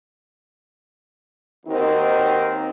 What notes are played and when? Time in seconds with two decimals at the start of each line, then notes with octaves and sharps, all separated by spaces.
1.66 D#2 D#3 C4 D#4 F#4 A#4